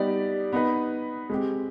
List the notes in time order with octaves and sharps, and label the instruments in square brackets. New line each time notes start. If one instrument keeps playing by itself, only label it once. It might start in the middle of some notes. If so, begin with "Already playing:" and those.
Already playing: [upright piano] G3 B3 D#4 G4 D5
B3 D#4 B4
G#3 C4 G4